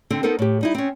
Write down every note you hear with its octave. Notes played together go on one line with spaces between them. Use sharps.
D3 C4 A4
B3 D#4 A4 A#4 C5
A2 G4
G3 D#4 E4
C4 C#4